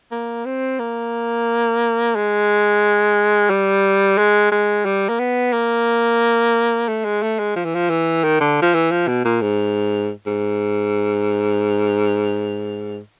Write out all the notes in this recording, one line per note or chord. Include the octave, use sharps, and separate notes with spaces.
A#3
C4
A#3
G#3
G3
G#3
G#3
G3
A#3
B3
A#3
A3
G#3
A3
G#3
F3
E3
F3
E3
D#3
D3
F3
E3
F3
B2
A#2
G#2
G#2